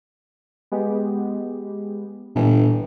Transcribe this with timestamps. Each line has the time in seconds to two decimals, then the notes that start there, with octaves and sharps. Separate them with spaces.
0.72 G#3 B3 G4
2.35 G1 A#2 E3